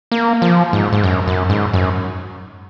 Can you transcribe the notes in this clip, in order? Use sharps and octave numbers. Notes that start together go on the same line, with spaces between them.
A#3
F3
G#2
G#2
F#2
F#2
G#2
F#2